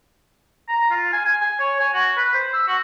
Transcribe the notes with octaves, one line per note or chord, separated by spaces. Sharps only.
A#5
F4
G#5
G#5
G#5
C#5
G#5
F#4
B4
C5
E6
F#4